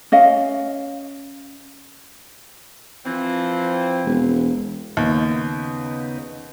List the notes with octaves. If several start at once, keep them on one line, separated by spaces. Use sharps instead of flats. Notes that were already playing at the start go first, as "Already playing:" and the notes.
C#4 D#5 F5
E3 F3 C4
E1
D#2 C#3 B3 D#4